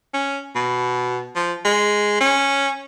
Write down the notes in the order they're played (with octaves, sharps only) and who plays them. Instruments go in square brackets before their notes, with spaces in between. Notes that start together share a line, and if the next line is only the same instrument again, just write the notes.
[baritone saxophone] C#4
B2
F3
G#3
C#4